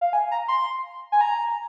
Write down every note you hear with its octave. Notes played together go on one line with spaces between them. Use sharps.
F5
G#5
A#5
C6
G#5
A#5